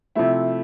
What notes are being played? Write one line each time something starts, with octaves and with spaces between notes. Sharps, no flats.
C3 F3 A3 E4